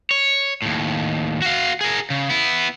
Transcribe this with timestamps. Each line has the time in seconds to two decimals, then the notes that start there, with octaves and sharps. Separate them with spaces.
0.11 C#5
0.62 D#2 A2
1.42 F#4 F5
1.81 G#4 A#4
2.10 C#3
2.29 B3 E4